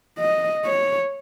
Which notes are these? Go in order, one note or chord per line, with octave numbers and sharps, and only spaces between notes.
D#5
C#5